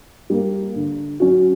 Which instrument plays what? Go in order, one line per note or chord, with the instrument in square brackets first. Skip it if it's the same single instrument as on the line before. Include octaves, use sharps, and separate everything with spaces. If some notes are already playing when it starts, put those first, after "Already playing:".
[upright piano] G3 A#3
D3
F#3 C#4 F#4